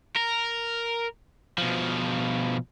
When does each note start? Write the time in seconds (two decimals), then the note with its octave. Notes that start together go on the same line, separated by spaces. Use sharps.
0.16 A#4
1.58 B2 F3